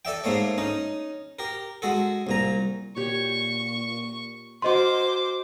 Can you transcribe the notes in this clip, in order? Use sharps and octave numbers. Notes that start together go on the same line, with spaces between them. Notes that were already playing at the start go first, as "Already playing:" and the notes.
A4 D5 E5 G5
G#2 A3 A#3 C#5 D5
C#4 D#4
G4 A#4
G#3 F#4 A4
C2 A#2 A#5
A#2 G4 C#5 C#6
F#4 A#4 C5 D#5 G#5 C6 D6